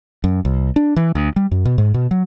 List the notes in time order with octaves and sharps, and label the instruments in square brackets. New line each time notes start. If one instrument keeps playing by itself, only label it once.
[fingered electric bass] F#2
C2
D4
E3
D2
G3
F#2
B2
G#2
B2
F#3